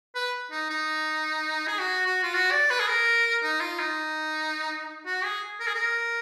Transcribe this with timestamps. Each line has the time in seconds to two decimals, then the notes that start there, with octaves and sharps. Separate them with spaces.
0.15 B4
0.51 D#4
0.70 D#4
1.67 G#4
1.79 F#4
2.06 F#4
2.23 F4
2.34 F#4
2.52 D5
2.70 B4
2.80 G#4
2.88 A#4
3.43 D#4
3.60 F4
3.79 D#4
5.06 F#4
5.24 G#4
5.60 A#4
5.67 G#4
5.75 A#4